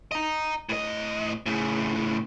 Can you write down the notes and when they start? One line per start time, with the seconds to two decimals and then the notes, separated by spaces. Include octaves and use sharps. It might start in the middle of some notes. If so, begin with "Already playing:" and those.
0.12 D#5 A#5
0.69 A2 D#5
1.46 A2 C#3